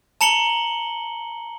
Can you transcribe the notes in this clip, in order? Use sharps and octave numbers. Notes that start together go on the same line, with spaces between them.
A5 A#5 C#7 F#7 G7